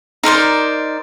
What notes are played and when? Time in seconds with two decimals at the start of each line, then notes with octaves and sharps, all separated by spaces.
0.23 D#4 A#4 C5 D5